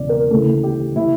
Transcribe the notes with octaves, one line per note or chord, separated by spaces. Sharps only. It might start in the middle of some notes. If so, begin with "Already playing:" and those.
Already playing: E1 E2 C#3 D5
A#4
D2 C#3 E3 A4
G4
E3 E4